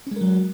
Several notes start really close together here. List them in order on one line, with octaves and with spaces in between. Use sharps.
C#4 G#3 A#4 F#3